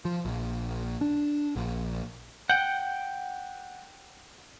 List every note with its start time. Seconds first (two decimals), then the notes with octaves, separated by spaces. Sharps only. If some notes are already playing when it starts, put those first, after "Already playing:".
0.05 F3
0.25 A#1
1.01 D4
1.56 A#1
2.49 F#5 G5 G6